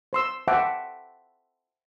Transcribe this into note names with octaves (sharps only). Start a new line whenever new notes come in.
C5 C6 E6
C5 E5 F#5 G5 A5 D6